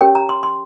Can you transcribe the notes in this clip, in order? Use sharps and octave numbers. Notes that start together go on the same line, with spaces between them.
C#4 G4 A#4 C#5 G5
A#5
C6
C6